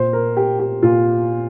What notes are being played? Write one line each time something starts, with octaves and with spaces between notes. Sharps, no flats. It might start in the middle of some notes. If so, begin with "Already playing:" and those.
Already playing: A#2 C5
A#4
G4
G4
A#2 F4